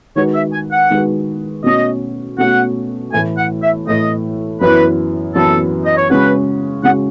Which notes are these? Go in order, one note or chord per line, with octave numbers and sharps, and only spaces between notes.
D#3 G#3 D#4 F#4 B4 C#5
E5
G#5
F#5
D#3 G#3 D#4 F#4 B4
B2 A3 C#4 F#4 D#5
B2 A3 C#4 F#4 F#5
A2 E3 A3 G#5
F#5
E5
A2 E3 A3 D#5
F#2 E3 B3 E4 B4
F#2 E3 B3 E4 A4
D#5
C#5
C#3 G#3 C#4 F#4 B4
C#3 G#3 C#4 F#4 F#5